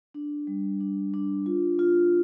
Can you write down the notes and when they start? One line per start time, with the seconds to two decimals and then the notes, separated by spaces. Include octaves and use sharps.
0.14 D4
0.47 G3
0.80 D4
1.14 D4
1.46 F4
1.79 F4